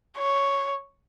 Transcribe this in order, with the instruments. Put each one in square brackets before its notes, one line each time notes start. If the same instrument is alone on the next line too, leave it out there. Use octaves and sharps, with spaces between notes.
[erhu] C#5